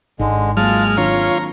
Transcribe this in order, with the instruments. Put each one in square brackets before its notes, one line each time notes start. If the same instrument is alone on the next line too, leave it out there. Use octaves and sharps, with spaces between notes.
[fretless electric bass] G#1 [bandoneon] D3 G#3 [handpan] D#4
[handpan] F#3 A#3 [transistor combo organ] G#3 F6 [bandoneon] F4 A5
[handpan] D#3 C4 D4 [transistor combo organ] F4 C#5 [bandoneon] A#5